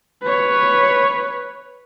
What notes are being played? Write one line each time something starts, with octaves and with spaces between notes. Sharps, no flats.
B4 C#5